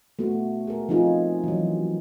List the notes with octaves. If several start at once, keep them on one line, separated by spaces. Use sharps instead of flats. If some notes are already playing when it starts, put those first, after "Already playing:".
A3 B3 F#4
G#4 A#4
F3 C4 D#4 F4 G#4
E3 F#3